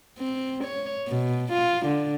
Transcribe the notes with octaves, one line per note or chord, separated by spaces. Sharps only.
C4
C#5
B2
F4
D3